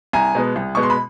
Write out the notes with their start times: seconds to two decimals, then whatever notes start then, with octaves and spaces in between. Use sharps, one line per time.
0.13 C2 G#5 A#5
0.35 B2 G#3 B3
0.56 C2
0.75 B2 G#3 B3 C#6
0.83 C6
0.90 B5